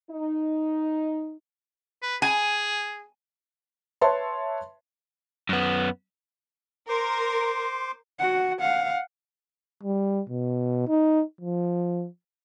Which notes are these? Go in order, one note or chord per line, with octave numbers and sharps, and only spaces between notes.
D#4
B4
G#4 G#5
B4 C#5 E5 A5 C6
F#2 B3
A#4 C5 C6 D6
F#4 F#5
F5 F#5
G3
B2
D#4
F3